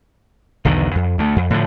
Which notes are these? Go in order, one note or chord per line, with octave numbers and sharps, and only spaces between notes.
B1 E2 D3 D#3
F2
D2 A3
F2
A2 D3 F3